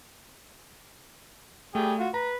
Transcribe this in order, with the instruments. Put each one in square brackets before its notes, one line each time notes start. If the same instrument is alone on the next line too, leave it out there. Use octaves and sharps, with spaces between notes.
[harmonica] G3 G#4 G5 [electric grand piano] A3
[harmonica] F4 F#4
[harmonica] B4 [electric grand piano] A#5